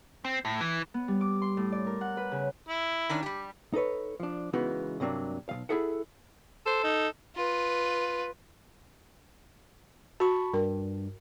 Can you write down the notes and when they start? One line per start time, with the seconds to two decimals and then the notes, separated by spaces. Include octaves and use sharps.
0.25 C4
0.45 A2
0.61 E3
0.94 B3
1.08 G3
1.21 D6
1.42 C6
1.57 A2
1.72 D5
1.87 A#4
2.01 F#5
2.17 B4
2.32 C#3
2.69 E4
3.09 D#3 C#4 D4
3.23 G3 G4
3.73 D#4 A4 B4 C#5
4.20 F3 D4
4.53 C#3 E3 G#3 B3 D#4 F#4
5.00 G2 C3 F#3 A#3 D4
5.49 B1 C#3 F5
5.69 E4 G#4 A4 E5 F#5
6.66 A4 C5
6.84 D#4
7.36 F4 B4
10.20 F#4 A5 B5 C#6
10.54 G2 A#4